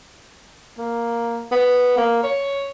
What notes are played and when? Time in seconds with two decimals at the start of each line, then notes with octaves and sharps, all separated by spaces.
0.78 A#3
1.51 B3
1.97 A#3
2.23 C#5